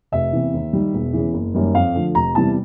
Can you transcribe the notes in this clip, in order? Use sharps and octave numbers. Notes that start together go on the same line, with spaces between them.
F1 E5
E2 C3 E3
D#2
D#3 G3
E1
E2 C#3 E3
F#1
F#2 D#3 G3 A#3
F2 F5
D3 F3 A3
F1 A#5
E2 C3 E3 G3 A5